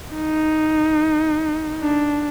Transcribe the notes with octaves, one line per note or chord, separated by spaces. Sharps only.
D#4
D4